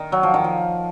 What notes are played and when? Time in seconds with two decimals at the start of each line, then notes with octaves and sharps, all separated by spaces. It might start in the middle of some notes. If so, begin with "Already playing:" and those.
Already playing: D#3
0.12 F#3
0.23 F3
0.34 D#3
0.44 F3